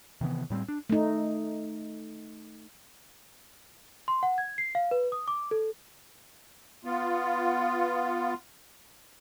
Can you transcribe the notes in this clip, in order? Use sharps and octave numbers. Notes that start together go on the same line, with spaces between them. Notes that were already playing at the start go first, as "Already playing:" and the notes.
C3 D#3 E3 B3
A2 G3 B3 C4
D4
A3 D#4
C6
F#5
G#6
C7
F5
B4
D#6
D6
A4
B3 F4